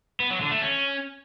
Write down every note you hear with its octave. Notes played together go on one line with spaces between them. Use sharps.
B3
F#3
D3
A3
C#4